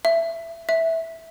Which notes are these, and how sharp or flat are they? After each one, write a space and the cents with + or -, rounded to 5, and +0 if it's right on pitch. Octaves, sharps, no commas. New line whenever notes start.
E5 +15
E5 -5